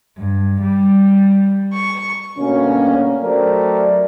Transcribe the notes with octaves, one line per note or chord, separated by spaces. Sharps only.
G2
G3
C#6
D2 B2 G3 A#3 C#4
F#3 A3 G4 A#4 C5 D5